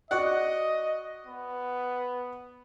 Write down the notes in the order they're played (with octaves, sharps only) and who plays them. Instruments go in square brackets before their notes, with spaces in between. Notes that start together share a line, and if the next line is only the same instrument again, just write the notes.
[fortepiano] F#4 D5 F#5 [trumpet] D#5
[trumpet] B3